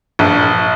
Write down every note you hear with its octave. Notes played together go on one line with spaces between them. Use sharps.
A#1